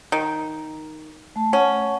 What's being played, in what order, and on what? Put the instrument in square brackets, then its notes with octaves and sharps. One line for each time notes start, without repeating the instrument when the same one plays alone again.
[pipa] D#3
[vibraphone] A3 A5
[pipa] C#4 [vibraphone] F#5 A5